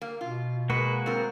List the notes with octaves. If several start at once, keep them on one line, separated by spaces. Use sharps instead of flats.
A#3
B2 F4
G#3 A#3 F#4 B4
C4 F4 A#4